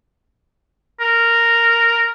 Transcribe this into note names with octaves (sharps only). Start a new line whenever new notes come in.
A#4